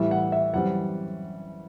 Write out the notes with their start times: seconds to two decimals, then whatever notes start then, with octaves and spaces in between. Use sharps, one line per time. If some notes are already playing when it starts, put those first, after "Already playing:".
Already playing: A2 E3 G3 E5
0.11 F#5
0.32 E5
0.53 F#2 E3 G3 C4 F#5